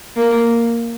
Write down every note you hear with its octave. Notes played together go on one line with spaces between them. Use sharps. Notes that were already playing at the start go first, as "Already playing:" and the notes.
A#3